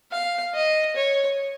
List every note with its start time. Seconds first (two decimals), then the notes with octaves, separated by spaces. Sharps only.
0.12 F5
0.55 D#5
0.96 C#5